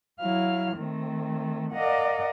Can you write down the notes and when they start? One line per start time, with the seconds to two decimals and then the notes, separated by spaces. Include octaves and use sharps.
0.20 F#3 E4 F5 F6
0.77 D#3 A3 C4
1.74 A#4 D5 D#5 F5 F#5